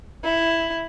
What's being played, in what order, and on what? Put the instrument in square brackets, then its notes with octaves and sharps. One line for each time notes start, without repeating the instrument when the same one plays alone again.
[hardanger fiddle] E4